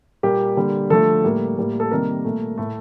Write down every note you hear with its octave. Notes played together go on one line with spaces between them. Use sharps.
A#2 G3 A#3 G4
D3 G3 A#3
D3 F3 A3 A4
A2 G3 A#3
A2 G3 A#3
A4
C3 D#3 G3 A#3 A#4
A#2 A3
A2 A3